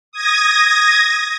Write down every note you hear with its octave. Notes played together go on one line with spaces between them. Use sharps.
D#6 G#6 A#6